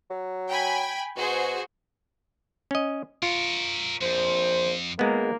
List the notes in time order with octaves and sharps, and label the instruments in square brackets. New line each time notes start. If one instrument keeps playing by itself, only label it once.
[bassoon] F#3
[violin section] G5 G#5 B5
[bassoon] B2 [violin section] F#4 G#4 C5
[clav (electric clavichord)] C#4 D#5
[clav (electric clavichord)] F4 [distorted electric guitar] A#4 C#5
[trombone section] A#1 C5 [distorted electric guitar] F2
[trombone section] G#1 A#3 [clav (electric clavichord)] G#3 B3